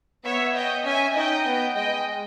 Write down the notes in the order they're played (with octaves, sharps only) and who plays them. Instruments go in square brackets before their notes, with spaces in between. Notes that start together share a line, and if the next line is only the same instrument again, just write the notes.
[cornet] B3 [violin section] C#5 E5
[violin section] D#5 G5
[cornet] C#4 [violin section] E5 G#5
[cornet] D#4 [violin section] D#5 G5
[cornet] B3
[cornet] G#3 [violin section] D#5 G5